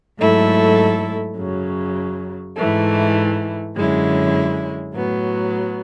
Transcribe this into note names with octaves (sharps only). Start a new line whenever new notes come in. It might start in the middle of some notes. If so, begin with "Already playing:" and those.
G#2 F#3 A3 E4 A4
F#2 C#3 F#3
G#2 E3 A3
F#2 D3 G#3 C#4 E4
A2 F#3 B3